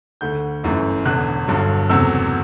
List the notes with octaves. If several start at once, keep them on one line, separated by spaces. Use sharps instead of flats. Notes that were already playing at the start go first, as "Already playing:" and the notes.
D2 D3 A3 G6
G1 F#2 E3 A3
E1 E2 D3 F#6
G1 G2 D3 F#3
F#1 E2 C3 F#3 A3 E6